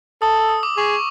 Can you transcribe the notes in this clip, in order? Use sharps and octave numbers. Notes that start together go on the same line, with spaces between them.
A4 D#6
E6
D#6
D6
G#4 C#6